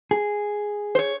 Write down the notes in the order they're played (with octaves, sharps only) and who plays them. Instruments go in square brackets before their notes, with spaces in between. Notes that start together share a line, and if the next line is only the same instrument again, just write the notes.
[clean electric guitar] G#4
[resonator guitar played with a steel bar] C5 C#5